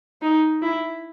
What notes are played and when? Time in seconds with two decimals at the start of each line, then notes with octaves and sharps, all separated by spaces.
0.22 D#4
0.62 E4